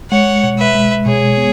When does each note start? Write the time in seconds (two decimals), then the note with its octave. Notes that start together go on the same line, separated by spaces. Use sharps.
0.12 G#3 C#5 F#5
0.44 B2
0.59 B4 E5
0.75 G#3
1.06 B2 G#4 C#5
1.37 B3